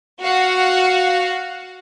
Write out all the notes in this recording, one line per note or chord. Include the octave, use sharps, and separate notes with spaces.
F#4 F5 F#5